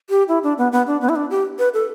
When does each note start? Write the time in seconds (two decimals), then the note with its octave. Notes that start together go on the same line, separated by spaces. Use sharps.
0.10 G4
0.28 E4
0.43 D4
0.58 B3
0.72 B3
0.87 D4
1.01 B3
1.09 E4
1.16 D4
1.31 G4
1.59 B4
1.74 A4